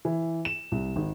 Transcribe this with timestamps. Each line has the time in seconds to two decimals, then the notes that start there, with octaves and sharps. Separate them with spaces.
0.05 E3
0.45 E7
0.72 C2
0.96 G#1